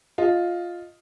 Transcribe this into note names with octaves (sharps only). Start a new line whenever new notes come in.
F4 D#5